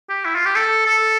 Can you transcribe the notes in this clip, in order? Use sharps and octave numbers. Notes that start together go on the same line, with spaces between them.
G4
E4
F4
G4
A4
A4